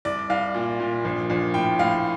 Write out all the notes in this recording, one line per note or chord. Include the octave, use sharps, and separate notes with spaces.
C2 D5
C2 F5
A#2
A#2
A#1
A#1
A2 G5
A2 F5